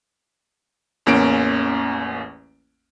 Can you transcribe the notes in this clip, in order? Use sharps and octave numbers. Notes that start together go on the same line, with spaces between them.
A1 E2 A#3 C#4 D7